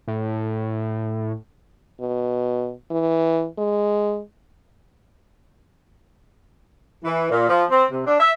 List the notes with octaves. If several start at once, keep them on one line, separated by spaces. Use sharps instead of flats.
A2
B2
E3
G#3
E3
A#2
F3
C4
C3
D4
E5